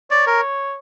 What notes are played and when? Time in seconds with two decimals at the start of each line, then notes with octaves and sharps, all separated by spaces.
0.11 C#5 D5
0.27 A#4